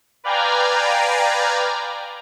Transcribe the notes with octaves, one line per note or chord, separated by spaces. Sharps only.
B4 D5 F5 G5 G#5 A#5